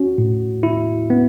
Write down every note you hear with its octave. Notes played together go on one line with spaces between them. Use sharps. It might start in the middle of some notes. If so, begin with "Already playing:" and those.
Already playing: C#4 F#4
A2
E4
B3